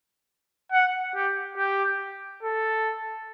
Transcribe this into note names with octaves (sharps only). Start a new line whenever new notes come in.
F#5
G4
G4
A4